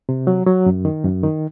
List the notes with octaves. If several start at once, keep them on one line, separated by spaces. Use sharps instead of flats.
C3
F#3
F#3
F#2
D#3
F#2
D#3